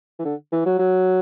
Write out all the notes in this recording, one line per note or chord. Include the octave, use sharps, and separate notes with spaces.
E3
D3
E3
F#3
F#3